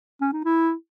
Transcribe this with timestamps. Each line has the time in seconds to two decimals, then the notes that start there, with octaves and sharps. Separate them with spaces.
0.21 C#4
0.33 D#4
0.45 E4